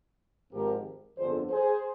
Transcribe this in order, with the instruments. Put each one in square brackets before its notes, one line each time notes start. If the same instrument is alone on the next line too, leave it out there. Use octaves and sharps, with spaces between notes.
[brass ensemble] G#1 G#2 F3 C4 D#4 G4 A#4
G1 F2 D3 F3 G#4 C5
G#4 C5